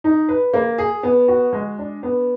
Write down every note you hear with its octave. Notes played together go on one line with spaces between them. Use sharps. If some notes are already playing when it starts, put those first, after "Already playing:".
D#4
B4
A#3
G#4
B3
F#4
G#3
D4
B3